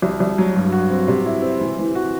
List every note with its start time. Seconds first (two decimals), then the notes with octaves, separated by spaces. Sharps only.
0.02 C2
0.20 C2
0.38 F#3
0.56 G2
0.72 F#4
0.91 C4
1.08 C3
1.26 E4
1.42 C4
1.61 E3
1.79 E3
1.95 F#4